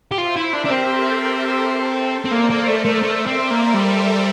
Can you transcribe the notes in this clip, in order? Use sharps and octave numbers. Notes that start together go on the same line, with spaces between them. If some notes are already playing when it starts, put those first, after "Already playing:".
G4
F4 C5 E5
E4
D4 G4 A#4
D4
C4
A4 C5
C4
A#3 A#4 D5
A#3
A3
A3
A3 C5 E5
C4
A#4 D5
A#3
G3 A4 C5